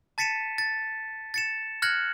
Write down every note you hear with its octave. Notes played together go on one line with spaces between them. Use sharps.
A5 A6 B6 C#7 D#7 E7
A6
A6 C#7 E7
F6 F#6 G#6 A#6 C#7 F#7